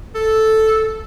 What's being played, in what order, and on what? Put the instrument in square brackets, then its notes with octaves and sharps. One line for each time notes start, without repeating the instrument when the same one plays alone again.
[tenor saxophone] A4